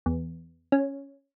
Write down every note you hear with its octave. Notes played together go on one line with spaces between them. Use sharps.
E2
C#4